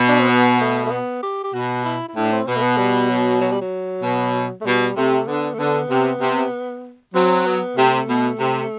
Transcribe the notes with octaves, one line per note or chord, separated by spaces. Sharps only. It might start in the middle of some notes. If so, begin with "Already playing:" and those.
Already playing: B2
D4
C4
B3
A3
A3
B3
G4
G4
B2 F#4
E4
E4
A2 D4
C4
B2 B3
A3
B3
G3
F#3
F#3
G3
F#3
B2
A3
B2 G3
C3 A3
D3 B3
A3
D3 B3
C3
C3
F#3 C4
B3
C3 A3
B2
C3